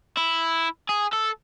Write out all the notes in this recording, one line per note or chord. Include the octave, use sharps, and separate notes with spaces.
E4
G#4
A4